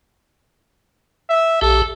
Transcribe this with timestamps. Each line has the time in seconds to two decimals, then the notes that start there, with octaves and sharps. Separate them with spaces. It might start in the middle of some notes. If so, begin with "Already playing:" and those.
1.30 E5
1.61 A#1 G4 A4